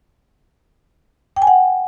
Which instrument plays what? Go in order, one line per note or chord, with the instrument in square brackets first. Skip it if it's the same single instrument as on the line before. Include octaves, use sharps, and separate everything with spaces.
[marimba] G5
G#5
F#5